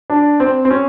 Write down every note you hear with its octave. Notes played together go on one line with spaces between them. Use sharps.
D4
C4
C4
C#4